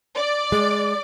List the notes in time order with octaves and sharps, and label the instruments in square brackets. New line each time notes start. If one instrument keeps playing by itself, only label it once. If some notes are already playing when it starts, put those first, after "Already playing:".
[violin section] D5
[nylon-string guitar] G#3 [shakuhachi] D6